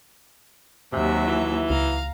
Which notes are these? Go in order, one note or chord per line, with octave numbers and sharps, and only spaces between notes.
D#2 C3 F#3 E5
E3
C#2 F5 A#5